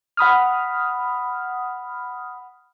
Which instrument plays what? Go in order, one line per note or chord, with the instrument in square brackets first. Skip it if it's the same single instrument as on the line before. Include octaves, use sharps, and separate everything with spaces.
[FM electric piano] F#5 B5 D#6 F6